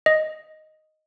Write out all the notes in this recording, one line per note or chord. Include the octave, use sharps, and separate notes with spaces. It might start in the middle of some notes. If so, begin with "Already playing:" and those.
D#5